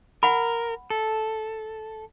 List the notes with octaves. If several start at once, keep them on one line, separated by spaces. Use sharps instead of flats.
A#4 F#5 B5
A4